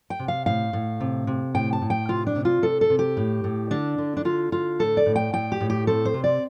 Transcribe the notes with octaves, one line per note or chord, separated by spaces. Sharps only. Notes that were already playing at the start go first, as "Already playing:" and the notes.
G5
C3
F5
A2 F5
A2
C3
C3
A2 G5
A5
A2
G5
C3 F4
D4
C3
F4
C3 A4
A4
C3
G4
A2
A2
D3 D4
D3
D4
D3 F4
D3 F4
A2 A4
D5
A2
G5
A2 G5
G4
A2
G4
C4 A4
C5
C3
D5